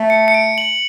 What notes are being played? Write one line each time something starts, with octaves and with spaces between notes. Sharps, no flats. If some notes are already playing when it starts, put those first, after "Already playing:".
Already playing: A3
C#7
C#7
D7
F#7